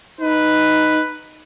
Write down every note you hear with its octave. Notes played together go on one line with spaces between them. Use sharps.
D#4 B4